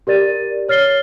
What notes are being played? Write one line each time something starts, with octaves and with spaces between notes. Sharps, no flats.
G4 A#4 D5 A6 D#7
C#5 F6 A6 C7 G7